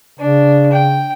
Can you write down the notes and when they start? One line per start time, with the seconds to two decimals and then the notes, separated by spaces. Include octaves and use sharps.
0.19 C#3 D4
0.72 G5